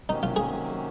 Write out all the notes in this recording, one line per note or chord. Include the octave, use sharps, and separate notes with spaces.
C3 D#3 F#3 A#3 C#4 D#4
F4
G#4